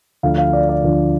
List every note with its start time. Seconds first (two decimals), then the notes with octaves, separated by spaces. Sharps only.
0.23 D2 D3 F3 F5
0.38 F5
0.53 D5
0.69 D5
0.84 D2 D3 F3